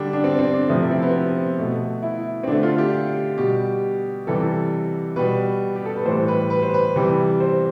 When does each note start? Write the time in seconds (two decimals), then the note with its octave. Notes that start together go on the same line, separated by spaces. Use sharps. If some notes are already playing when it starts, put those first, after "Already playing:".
Already playing: D3 G3 D4
0.13 D4
0.24 C4
0.39 C4
0.54 D4
0.68 C3 F3 A3 E4
0.81 E4
0.91 C4
1.02 B3
1.14 C4
1.58 B2 A3
2.03 E4
2.43 C4
2.48 D3 A3 D4
2.63 F4
2.78 G4
3.37 B2 G3 G4
4.27 C3 E3 G3 A4
5.16 B2 G3 B4
5.76 G4
5.85 A4
5.96 B4
6.05 A2 E3 G3 C5
6.28 B4
6.50 B4
6.62 C5
6.74 B4
6.96 C3 E3 G3
7.40 C5